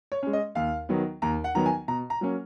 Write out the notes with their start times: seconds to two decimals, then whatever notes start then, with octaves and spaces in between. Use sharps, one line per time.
0.12 C#5
0.23 G#3 C#4
0.33 D#5
0.55 D#2 F5
0.89 D#3 F#3 B3
1.22 D#2 A#5
1.44 F#5
1.55 D#3 F#3 B3 A#5
1.66 G#5
1.88 B2 A#5
2.10 A#5
2.21 F#3 A#3 C#4